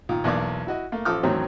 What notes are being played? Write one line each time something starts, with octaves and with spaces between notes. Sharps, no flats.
A#2 D#3
B1 E2 A#3 D5 D6
E4 F#4 D#5
A3 A#3
A1 F3 A4 D6 D#6 F6
E2 A2 D#3 F#3 C4 C#4